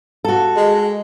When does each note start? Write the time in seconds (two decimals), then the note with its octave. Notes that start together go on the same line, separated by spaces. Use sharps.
0.25 F#4 A4
0.56 G#3